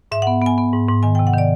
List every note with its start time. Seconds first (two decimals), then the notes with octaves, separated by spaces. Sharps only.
0.12 G#2 E5
0.22 B3 F#5
0.42 B3 G#5
0.58 B3
0.73 G#2
0.88 G#2
1.03 D#3 G#5
1.15 C3 G5
1.27 F#5
1.33 D#3 D5